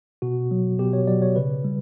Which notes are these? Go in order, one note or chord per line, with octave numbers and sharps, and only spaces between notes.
B2 F#4
F#3
B2 G4
C#5
F#3 D5
C#5
C#3 B4
G3